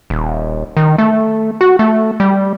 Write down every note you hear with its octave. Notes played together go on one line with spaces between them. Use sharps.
D#1
D#3
A3
F#4
A3
G3